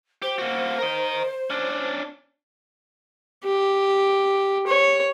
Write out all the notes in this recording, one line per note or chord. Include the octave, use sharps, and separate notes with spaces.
G4 C5
A#3 F#4
A#4 D#5
C#4 D4
G4
C#5